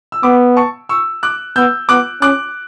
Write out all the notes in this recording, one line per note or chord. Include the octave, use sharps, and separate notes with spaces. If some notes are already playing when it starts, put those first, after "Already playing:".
E6
B3 B5 D6
A5 C#6
C#6 E6
D6 F#6
B3 E6 G6
B3 D6 F#6
C#4 D6 F#6